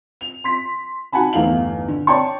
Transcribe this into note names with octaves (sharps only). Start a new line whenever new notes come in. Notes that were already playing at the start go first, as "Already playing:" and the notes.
F7
C6 B6
D#4 F#4 F#5 G#5 A5 B5
G1 E2 A3 D#4 F5 F#7
D3
C#5 D5 G5 A5 C#6